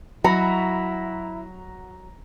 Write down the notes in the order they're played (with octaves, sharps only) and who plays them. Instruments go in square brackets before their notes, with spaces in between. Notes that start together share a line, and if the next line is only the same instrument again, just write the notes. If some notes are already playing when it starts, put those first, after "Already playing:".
[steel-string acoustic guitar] F#3 [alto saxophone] E4 [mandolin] F#4 B5 [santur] A#5